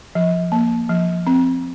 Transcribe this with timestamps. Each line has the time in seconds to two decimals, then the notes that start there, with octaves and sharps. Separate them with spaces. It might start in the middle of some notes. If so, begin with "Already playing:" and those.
0.15 F3
0.52 A#3
0.89 F3
1.27 C4